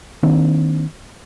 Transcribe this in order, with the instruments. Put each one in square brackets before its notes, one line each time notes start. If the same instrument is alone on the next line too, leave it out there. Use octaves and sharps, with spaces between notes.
[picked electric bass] D#3 A#3 C4 D4